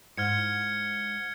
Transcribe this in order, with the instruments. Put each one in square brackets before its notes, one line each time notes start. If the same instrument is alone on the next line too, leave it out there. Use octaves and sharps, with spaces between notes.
[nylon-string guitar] G#2 [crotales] F6 G#6 C#7